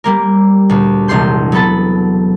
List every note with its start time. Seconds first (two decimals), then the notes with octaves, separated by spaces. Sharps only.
0.04 G3 A#3 A#4
0.69 D2 A#2
1.08 E1 A#1 C3 C6 G6
1.52 F#3 B3 A4 B5 A6